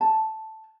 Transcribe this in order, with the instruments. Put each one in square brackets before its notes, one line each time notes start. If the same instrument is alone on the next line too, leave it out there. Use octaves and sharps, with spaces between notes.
[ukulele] A5